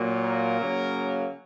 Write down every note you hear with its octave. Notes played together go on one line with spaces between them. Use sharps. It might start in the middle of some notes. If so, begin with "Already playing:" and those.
Already playing: A#2 F#3 A#3
A#4
C#3 F#3 A#3